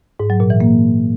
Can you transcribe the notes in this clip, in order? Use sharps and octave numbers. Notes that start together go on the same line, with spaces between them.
G#2
F#3
A#2
E3
A#3